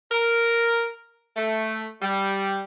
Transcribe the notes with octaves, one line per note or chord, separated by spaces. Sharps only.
A#4
A3
G3